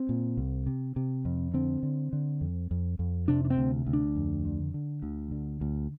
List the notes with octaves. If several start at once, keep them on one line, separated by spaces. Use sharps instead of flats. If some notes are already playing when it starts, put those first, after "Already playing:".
Already playing: C4
A#2
C2
C3
C3
F2
D3 C4
D3
D3
F2
F2
F2
C3 D4
D4
C4
D2
D2
D4
F2
D3
D3
D2
D3
D2